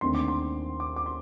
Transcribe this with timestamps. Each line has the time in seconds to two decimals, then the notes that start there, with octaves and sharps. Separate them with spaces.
0.01 D#2 D3 A3 C4 C6
0.15 D6
0.28 C6
0.80 D6
0.96 D6
1.06 C6